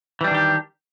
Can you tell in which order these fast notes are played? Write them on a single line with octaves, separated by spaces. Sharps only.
E3 G3 D4 D#3 G4